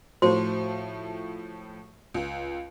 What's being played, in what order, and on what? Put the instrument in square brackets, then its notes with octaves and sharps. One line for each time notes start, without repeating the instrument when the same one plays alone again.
[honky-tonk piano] A2 F3 A3 [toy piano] F#4 C5
[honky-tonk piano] C#2